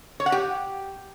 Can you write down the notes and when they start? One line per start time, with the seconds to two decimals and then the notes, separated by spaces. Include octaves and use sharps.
0.20 C#5
0.26 F#5
0.32 G4